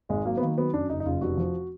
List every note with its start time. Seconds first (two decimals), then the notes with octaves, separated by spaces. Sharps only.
0.09 G#1 G#3
0.25 F#3 A#3
0.37 B3
0.41 D#3 A#3
0.57 F#3 B3
0.73 F#2 D4
0.90 F#1 D#4
1.00 D#4
1.06 F#1 F4
1.21 F1 F#4
1.37 F3